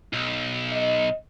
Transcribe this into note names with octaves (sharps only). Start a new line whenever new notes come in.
B1
D#5